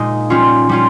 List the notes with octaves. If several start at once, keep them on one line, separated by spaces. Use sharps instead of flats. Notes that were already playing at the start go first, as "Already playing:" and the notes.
Already playing: A#2 G#3 D#4
G3 C#4 F4
G3 C#4 F4